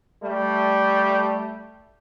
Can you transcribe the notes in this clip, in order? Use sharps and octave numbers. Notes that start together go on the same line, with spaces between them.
G3 A3